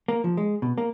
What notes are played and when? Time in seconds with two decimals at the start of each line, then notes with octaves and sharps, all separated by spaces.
0.08 A#3
0.24 F3
0.37 G#3
0.62 B2
0.78 A#3